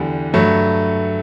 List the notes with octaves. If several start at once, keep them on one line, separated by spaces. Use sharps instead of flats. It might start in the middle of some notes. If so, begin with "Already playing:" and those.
Already playing: E2 D3 G3
G2 F#3 A3